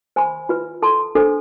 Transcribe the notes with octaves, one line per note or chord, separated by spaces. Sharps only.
C5 G#5 B5
F4 B4 E5 B5
A4 E5 A5 C6
D4 A4 C5